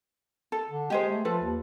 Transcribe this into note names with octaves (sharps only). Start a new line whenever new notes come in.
A4
D3
G#3 G4 G#4 C5
A3
F3 F4 A4 B4
D#2